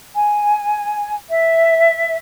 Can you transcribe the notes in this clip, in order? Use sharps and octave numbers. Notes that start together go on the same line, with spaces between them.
G#5
E5